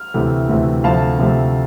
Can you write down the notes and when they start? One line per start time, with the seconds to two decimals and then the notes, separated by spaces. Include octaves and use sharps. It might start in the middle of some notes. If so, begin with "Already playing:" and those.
Already playing: F6
0.14 D2 C3 E3 A3
0.49 D2 C3 E3 A3
0.84 D2 C3 F3 A3 F5 A5
1.19 D2 C3 F3 A3